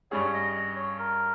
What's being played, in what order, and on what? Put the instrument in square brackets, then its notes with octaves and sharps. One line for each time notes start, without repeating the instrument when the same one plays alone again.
[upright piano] G2 G3 C#4 G#4 [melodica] C#5
[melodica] D#5
D#5
C#5
A#4